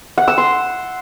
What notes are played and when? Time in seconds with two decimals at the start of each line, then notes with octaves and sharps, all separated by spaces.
0.18 F#5
0.28 E6
0.38 C6